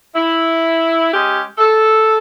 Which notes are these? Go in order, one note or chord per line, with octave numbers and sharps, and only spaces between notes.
E4
G#3 C#4 G4
A4